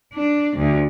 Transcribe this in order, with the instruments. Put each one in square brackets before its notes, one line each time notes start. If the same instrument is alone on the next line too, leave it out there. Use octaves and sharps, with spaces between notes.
[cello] D4
D2